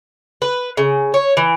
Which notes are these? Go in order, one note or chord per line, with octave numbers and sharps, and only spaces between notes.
B4
C#3
C#5
E3